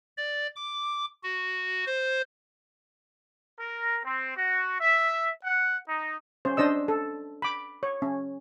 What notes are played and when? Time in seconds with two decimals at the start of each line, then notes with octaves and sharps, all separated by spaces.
0.17 D5
0.56 D6
1.23 F#4
1.86 C5
3.59 A#4
4.05 C4
4.37 F#4
4.80 E5
5.44 F#5
5.87 D#4
6.45 C#4 C5
6.57 D4 C5 D#5 E6
6.88 A4
7.42 B5 D6
7.83 C#5
8.02 C#4